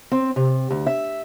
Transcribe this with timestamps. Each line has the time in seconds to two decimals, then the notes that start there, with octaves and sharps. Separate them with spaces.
0.12 C4
0.36 C3
0.71 D2
0.87 E5